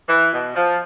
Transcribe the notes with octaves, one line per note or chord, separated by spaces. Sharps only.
E3
B2
F3